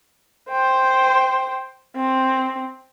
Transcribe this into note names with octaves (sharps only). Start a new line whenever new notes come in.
C5 G5
C4